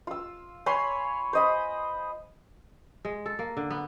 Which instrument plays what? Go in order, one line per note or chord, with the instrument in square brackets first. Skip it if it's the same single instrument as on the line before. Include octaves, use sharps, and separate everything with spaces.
[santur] F4 E6
C#5 G#5 B5 C6
C5 D#5 B5
[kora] G#3
A4
A#3
D3
B3